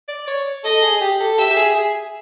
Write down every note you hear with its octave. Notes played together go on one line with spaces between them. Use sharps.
D5
C#5
A4 D#5
G#4
G4
A4
G4 E5
G4
G#4
G#4